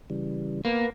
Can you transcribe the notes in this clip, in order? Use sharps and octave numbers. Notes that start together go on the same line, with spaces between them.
C#3 E3 G3
A#3 B3 A#4 B4